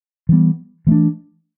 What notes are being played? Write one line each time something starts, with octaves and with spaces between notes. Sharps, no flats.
E3 G3 B3
E3 A3 D4